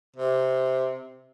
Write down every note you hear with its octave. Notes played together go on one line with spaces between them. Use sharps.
C3